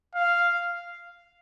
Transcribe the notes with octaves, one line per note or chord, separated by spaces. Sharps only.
F5